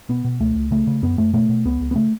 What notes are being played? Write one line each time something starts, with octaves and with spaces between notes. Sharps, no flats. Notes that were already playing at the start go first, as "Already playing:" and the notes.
B2 B3
B2
C#2 A3
C#2
C#3 A3
C#3
F#2 B3
F#2 A3
B2 A3
B2
C#2 B3
C#2
B3
C#3 A3